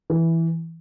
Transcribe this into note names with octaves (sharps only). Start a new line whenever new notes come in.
E3